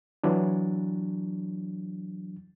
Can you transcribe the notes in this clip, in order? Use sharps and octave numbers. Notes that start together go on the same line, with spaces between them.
E3 F#3 D4